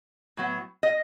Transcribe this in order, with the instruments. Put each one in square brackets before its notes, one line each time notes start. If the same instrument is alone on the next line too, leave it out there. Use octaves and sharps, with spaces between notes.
[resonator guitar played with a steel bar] A2 F#3 B3
D#5